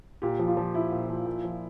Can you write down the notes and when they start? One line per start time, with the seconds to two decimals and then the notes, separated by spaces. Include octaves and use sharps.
0.22 A#2 G4
0.39 F3
0.48 F4
0.57 F3
0.74 A#2 E4
0.92 A#2
1.10 F3
1.26 A#2
1.45 F3